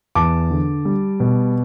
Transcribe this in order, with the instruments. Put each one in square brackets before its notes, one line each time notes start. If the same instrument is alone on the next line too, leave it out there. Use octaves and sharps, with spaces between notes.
[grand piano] E2 A5 D6
D3
G3
B2